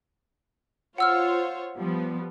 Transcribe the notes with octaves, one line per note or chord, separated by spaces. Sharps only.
F4 C5 C#5 F#5 E6 F6
F3 G3 B3